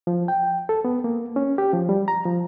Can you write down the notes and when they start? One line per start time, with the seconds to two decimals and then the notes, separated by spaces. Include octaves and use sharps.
0.07 F3
0.28 G5
0.69 A4
0.85 B3
1.04 A#3
1.36 C#4
1.58 G4
1.73 F3
1.89 G3
2.08 A#5
2.25 F3